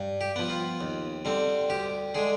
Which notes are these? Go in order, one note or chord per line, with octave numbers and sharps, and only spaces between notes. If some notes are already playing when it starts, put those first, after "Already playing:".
Already playing: G2
G4
F3 B3
F4
D#2
D3 G3 C4
D2 G4
D3 G#3 G#4